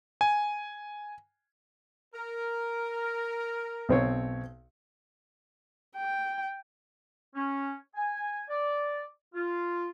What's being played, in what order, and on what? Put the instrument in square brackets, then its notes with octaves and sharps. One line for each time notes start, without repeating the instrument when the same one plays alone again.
[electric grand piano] G#5
[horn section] A#4
[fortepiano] B1 C4 C#5
[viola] G5
[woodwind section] C#4
G#5
D5
F4